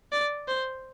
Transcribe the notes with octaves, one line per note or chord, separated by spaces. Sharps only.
D5
C5